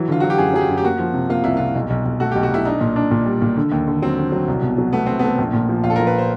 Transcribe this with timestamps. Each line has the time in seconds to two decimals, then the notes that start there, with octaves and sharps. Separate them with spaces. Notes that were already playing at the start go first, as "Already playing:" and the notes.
Already playing: E3 F#3
0.08 D3 F4
0.20 F#3 F#4
0.30 G4
0.38 F#2 G#4
0.54 F#3 G#4
0.61 G4
0.68 F#2
0.77 G4
0.84 A#3 F#4
0.99 F3
1.14 C3
1.29 A#3 F4
1.44 C2 E4
1.57 C2 F4
1.75 B1
1.90 B1
2.05 B1
2.20 A3 F#4
2.32 G4
2.36 B1
2.43 F#4
2.51 B1 E4
2.65 D4 D#4
2.81 A#2
2.96 D4
3.11 A#2
3.26 G3
3.42 A#2
3.57 D3
3.72 D#2
3.88 D3
4.02 F#3 C4
4.18 D3
4.32 F#3
4.48 C2
4.62 B2
4.78 F#3
4.93 A3 B3
5.06 A3 C4
5.19 A3 B3
5.38 A#1
5.53 A#2
5.69 F3
5.84 A#1 F4
5.90 A4
5.96 A#4
5.99 F3
6.07 B4
6.18 C5